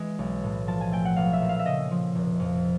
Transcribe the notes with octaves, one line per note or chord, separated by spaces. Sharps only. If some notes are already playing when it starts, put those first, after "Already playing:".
Already playing: E3 G#3
B1
A2
F3 A5
G#5
A3 G5
F#5
B1 F5
E5
A#2
F5
E5
C#3 D#5
F3
F1
F2